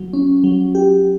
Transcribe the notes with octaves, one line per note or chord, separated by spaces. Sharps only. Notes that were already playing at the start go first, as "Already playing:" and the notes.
Already playing: F#3
C#4
F#3
G4